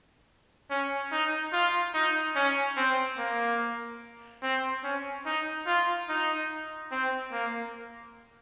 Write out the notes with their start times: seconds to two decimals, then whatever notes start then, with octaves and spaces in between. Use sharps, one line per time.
0.71 C#4
1.12 D#4
1.53 F4
1.95 D#4
2.36 C#4
2.77 C4
3.18 A#3
4.43 C4
4.84 C#4
5.26 D#4
5.67 F4
6.09 D#4
6.92 C4
7.33 A#3